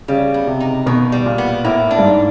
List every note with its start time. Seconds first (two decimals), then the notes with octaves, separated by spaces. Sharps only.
0.08 C#3 G3
0.34 B3
0.47 C3
0.60 D#4
0.86 B2 D#3
1.12 G3
1.26 A#2
1.38 B3
1.64 A2 A#3
1.91 D4
1.98 G2
2.03 G#2